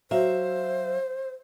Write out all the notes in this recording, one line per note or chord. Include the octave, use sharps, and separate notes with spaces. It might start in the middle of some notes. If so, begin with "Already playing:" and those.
F#3 C5 E5 F5